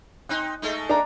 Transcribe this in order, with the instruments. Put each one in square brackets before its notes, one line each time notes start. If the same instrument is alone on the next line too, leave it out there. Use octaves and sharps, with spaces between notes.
[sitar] C4 D#4 [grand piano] F#6
[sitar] G#3 A3 D#4
[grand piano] D4 A#5